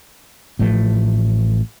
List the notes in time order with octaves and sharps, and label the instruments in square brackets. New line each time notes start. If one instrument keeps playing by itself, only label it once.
[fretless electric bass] A1 A2 F3 A3